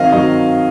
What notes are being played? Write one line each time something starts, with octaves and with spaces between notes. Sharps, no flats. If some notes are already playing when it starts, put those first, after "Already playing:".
Already playing: D#3 F#3 C4 D#5 F5
D#3 F#3 C4 D#5